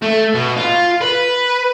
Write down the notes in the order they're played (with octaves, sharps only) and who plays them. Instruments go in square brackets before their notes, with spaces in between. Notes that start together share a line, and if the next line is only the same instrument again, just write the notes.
[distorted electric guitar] A3
B2
F4
B4